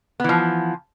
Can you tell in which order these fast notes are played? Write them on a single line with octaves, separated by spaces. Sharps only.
B3 E3 F3